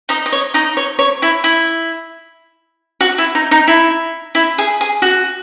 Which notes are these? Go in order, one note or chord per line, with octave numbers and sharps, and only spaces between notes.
D#4 D#5
D#5
C#5
D#4 D#5
C#5
C#5
E4
E4
F#4
E4
D#4
D#4
E4
E4
G#4
G#4
F#4